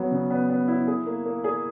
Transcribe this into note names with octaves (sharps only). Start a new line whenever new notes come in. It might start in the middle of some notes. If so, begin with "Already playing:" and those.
Already playing: F#3 B3
C#3
B3
B3
E4
G#4
A#3
A#3
G#4